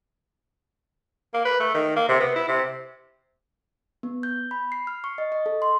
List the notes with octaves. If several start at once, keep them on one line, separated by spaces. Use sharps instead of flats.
A#3
B4
A3
D#3
A#3
C3
B3
E4
C3
B3
G6
B5
C7
F6
C#6
D#5
D#5
A4
C6